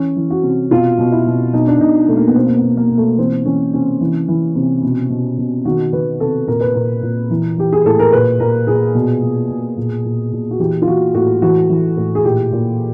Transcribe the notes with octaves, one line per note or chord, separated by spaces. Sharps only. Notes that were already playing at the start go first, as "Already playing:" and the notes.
Already playing: E3 C#4
E3
F#4
C3
B2 F4
B2
E4
B2
B2 D#4
D4
B2 D#4
B2 A3
A#3
B3
B2 C4
A#3
B3
B2
A#3
B2
A3
E3 C4
E3 C#4
C3 C#4
E3
E3
C3
B2
B2
B2
D#3 F#4
D#3 B4
C3 A4
A#2 A#4
B4
A#2 A#4
A#2
E3
E3 G4
G#4
A2 A4
A#4
A#2 B4
A#2 A#4
A#2 G#4
B2
B2
B2
A#2
A#2
A#2
F#4
E3 G4
F4
E3 F#4
A2 F#4
E3 F#4
E3
A2
G#4
A#2 G4
A#2